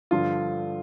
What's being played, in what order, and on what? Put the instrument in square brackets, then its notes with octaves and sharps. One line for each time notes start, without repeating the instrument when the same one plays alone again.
[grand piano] G2 D3 F3 F4